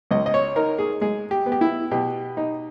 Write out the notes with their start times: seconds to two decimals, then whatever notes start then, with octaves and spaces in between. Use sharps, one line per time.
0.11 C#2 D#5
0.26 D#5
0.34 C#5
0.56 D#4 A#4
0.78 G#4
1.01 G#3 G#4
1.31 G4
1.46 B3
1.52 G4
1.61 E4
1.91 B2 G4
2.37 D#4